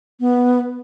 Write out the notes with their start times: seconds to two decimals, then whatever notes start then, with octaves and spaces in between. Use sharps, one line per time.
0.20 B3